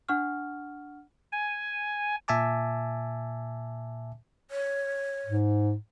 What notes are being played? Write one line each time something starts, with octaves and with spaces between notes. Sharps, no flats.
D4 F#5 C#6 F6
G#5
A#2 E5 G#5 A5 D6
C#5
G#2